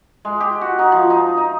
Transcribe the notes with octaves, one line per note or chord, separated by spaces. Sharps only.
G#3
G4
F#4
D#4
F3
D#4
D#4